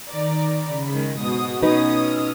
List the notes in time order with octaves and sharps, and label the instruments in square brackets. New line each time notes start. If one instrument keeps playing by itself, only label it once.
[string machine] D#3 [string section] D5 A#5
[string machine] C#3 B5
[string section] D#3 G#3
[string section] G#2 B2 D#6 [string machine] F#4
[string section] B2 C#4 D#6 [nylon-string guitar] D#4 B4
[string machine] E6 F6